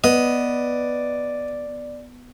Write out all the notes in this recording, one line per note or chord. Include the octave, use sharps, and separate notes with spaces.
B3 D5 D#5